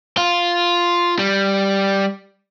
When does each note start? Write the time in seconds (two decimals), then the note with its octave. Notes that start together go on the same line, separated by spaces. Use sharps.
0.17 F4
1.19 G3